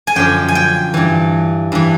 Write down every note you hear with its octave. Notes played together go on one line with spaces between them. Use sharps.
G#5
F#2 D3 F3 G5
G#5
G5
G2 E3
G2 E3